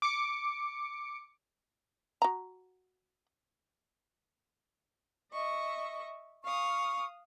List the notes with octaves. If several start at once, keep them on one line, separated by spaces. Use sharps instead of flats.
D6 C#7
F#4 A#5
D#5 E5 C#6
F5 C#6 D#6